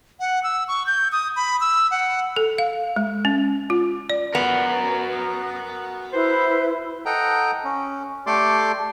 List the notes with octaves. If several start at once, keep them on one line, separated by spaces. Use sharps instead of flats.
F#5
E6
C#6
G6
D#6
B5
E6
F#5
A4
F5
G#3
C#4
F4
D5
B3 F#4 A#4
E4 B4 C5
A4 D#5 F#5 G5 A#5
C#4
A3 G4 A4 D5 C6 D6